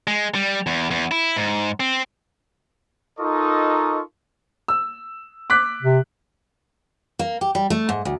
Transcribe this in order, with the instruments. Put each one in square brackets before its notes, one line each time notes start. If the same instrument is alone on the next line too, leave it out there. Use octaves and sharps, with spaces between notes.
[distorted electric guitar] G#3
G3
E2
E2
E4
G#2
C4
[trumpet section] D#4 F4 A4 A#4 D#5 C#6
[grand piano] E6
D6 F#6 B6
[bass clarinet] C3
[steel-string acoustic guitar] A#3
G4
G3
A3
G#2
D2